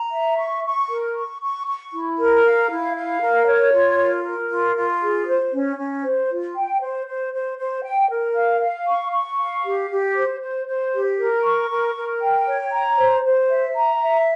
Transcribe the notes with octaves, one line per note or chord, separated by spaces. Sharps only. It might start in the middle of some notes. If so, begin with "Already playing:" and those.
Already playing: A#5
E5
C#6
C#6
A#4
C#6
C#6
C#6
E4
A#4
F5
E4
F5
A#4
C#5
F4
A#4
A#4
F4
F4
G#4
C5
C#4
C#4
C5
F4
G5
C5
C5
C5
C5
G5
A#4
F5
F5
C#6
C#6
F5
G4
G4
C5
C5
C5
G4
A#4
C#6
A#4
A#4
G5
C#5
A#5
C5
C5
E5
A#5
E5